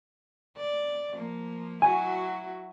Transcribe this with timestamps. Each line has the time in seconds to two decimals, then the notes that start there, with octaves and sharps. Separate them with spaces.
0.57 D5
1.14 F3 A#3
1.82 F#3 E4 F#4 G#5